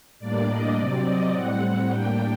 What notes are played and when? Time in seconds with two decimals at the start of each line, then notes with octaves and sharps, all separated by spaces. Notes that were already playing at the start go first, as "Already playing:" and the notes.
0.20 A2 G3 A#3 D4 D5
0.49 D#5
0.76 C3 F#3 C4 D5
1.04 D#5
1.32 A2 G3 C4 F#5
1.89 A2 G3 A#3 D4 G5